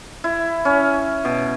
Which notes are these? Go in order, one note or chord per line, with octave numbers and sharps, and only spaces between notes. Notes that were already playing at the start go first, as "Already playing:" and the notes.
E4
C#4
B2